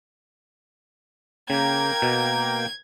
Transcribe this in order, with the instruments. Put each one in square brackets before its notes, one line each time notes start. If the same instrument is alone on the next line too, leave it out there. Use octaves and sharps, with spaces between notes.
[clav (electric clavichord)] C#3 [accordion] A#3 G5 [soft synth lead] A#5 [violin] G#6
[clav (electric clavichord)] B2